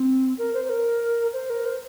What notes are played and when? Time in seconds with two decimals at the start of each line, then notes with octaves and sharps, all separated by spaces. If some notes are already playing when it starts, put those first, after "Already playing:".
Already playing: C4
0.38 A#4
0.54 C5
0.65 C5
0.69 A#4
1.33 C5
1.50 A#4
1.65 C5